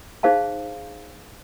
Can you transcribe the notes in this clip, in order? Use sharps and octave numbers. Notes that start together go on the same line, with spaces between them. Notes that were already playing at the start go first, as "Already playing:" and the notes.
D#4 G#4 C5 F5 A5